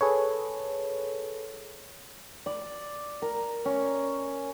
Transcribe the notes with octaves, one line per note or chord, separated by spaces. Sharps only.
G#4 A4 B4 C#5
D5
A#4
C#4